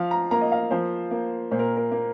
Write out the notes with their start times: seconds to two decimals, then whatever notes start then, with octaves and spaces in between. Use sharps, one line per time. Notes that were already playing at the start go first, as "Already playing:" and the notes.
Already playing: F3 F5
0.11 A#5
0.31 A#3 A#5
0.41 D#5
0.52 F5
0.71 F3 C5
1.11 A#3
1.51 A#2 C5
1.59 A#4
1.77 A#4
1.92 A#3